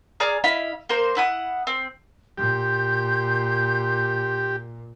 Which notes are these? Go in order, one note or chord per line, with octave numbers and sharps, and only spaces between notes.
G#4 D5 A#5 F6
E4 D#5 F5 B5
A#3 A#4 C5
E4 F#5 D#6
C4
A#2 G4 C6 G6